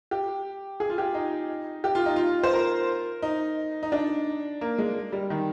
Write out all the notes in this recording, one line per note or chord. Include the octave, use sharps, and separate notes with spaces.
G4
G#4
F4
G4
D#4
G4
F4
D#4
F4
C5
A#4
D#4
D#4
D4
A#3
G#3
G3
D#3